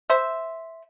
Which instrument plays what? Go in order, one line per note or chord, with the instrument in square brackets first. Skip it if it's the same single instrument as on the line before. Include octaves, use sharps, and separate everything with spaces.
[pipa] C5 E5